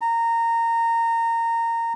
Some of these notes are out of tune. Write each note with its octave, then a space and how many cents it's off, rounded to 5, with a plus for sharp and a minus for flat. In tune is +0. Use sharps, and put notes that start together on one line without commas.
A#5 -20